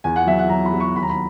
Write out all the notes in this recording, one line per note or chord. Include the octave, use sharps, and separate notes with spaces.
E2 G#5
F#5
F#3 E5
F#5
F#3 A#5
B5
F#3
C#6
D#2 B5
A#5
B5